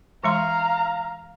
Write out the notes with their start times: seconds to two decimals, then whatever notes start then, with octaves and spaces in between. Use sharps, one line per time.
0.24 E3 G#3 F5 A#5 C6